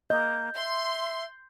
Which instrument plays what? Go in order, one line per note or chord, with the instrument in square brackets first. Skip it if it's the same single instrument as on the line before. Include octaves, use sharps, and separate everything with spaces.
[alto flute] A#3 [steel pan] D#5 [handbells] G6
[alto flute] E5 [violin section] C6